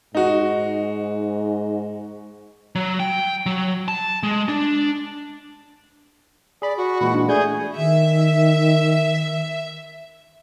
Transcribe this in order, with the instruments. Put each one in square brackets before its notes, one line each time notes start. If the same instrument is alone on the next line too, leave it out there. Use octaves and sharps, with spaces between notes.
[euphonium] G#2 [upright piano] D#4 F#4
[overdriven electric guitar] F#3
G5
F#3
A5
G#3
D4
[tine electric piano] G#4 B5 [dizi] D5
[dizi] F#4
[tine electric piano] A#2 E3 G#3 [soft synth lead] B5
[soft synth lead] D4
[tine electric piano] A3 G#5 G6 [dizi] G#4 [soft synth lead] D5
[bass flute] D#3 [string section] E5